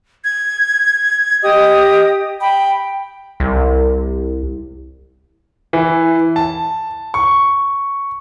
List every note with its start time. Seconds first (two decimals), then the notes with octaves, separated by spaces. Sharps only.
0.23 G#6
1.43 G4 D#5 D#6
2.41 G5 B5
3.40 C2
5.73 E3
6.36 A5
7.14 C#6